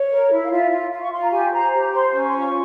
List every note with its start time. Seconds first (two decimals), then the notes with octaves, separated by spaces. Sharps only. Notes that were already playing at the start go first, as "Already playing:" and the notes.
Already playing: C#5
0.10 A#4
0.30 E4
0.43 F5
0.50 F4 E5
0.71 F4
0.91 F4 F5
1.01 C#6
1.11 F4 C6
1.21 A#5
1.31 G4 G#5
1.52 C5 A#5
1.72 G4 A#5
1.92 C5 C6
2.12 C#4
2.21 C#6
2.28 C6
2.34 F4 C#6